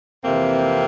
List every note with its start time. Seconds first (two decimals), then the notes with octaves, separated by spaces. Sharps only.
0.24 F2 C3 E3 A#3 C4